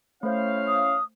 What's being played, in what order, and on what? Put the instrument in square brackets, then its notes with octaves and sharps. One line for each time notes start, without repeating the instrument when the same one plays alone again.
[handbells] A3 C5 G6 [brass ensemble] C#4 E4 F5
[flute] D#6